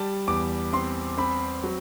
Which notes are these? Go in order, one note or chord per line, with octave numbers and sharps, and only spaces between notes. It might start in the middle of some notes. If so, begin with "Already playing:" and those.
Already playing: G3 A5
E2 D6
C4 C6
C4 B5
F#3